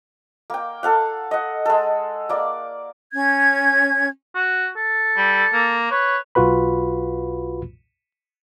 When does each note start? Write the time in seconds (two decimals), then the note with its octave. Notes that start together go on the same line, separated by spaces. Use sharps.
0.50 A#3 G5
0.83 A4 F5 F#5
1.31 D#5 F#5
1.66 G#3 A4
2.29 A#3 D5
3.13 C#4 G#6
4.35 F#4
4.77 A4
5.17 G3
5.53 A#3
5.91 B4 C#5
6.35 B1 F4 F#4 B4 B5